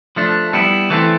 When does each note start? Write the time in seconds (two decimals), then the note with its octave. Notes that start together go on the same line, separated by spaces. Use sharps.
0.16 F3 A3 D4
0.53 G3 B3 E4
0.90 E3 A3 C4